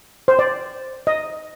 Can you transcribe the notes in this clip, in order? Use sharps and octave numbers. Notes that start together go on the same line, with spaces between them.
C5
D5
D#5